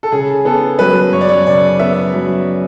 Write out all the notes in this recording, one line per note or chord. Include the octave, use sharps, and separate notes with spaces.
A4
C#3 G#4
B3 A4
F#3 B4
F#2 C#5
D5
C#5
C#3 D5
B3 E5
F#3